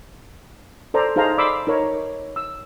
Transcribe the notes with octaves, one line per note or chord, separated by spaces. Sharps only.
A4 C5 D5 A#5
D#4 G#4 C5 F5 A5 A#5
D5 B5 C6 D6 E6
D#4 A#4 C#5 A#5
E6